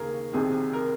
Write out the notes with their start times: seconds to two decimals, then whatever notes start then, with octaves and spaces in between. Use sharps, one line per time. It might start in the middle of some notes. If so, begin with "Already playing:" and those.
Already playing: D#2 C#3 G#4 A#4
0.32 C2 C3 D#3 G#4
0.73 A#4